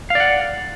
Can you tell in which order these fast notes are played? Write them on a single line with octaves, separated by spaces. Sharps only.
F5 D5 F#5